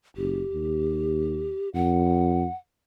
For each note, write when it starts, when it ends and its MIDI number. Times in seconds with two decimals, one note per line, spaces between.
0.17 0.42 30
0.17 1.69 67
0.52 1.52 39
1.74 2.46 41
1.74 2.55 78